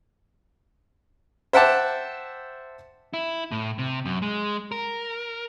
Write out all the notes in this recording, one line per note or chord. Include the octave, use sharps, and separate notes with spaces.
C5 E5 F#5 G5 A5 D6
E4
A2
C3
F#2
G#3
A#4